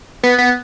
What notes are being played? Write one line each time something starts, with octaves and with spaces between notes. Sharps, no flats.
B3
B3